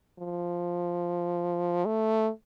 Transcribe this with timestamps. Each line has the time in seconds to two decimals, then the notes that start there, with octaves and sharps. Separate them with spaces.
0.19 F3
1.86 A3